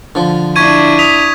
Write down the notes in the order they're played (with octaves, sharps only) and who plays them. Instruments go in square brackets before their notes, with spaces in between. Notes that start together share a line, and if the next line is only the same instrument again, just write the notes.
[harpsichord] D3 F3
[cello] D4 E4 [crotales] C#6 G#6 D#7
[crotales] D#6 B6 F7